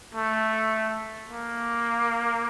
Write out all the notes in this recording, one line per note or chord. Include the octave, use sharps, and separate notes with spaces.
A3
A#3